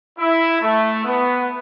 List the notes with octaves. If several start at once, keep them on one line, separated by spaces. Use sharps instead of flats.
E4
A3
B3